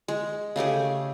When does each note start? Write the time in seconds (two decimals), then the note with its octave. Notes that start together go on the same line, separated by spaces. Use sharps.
0.08 G#3
0.56 C#3 A3 G4 G#4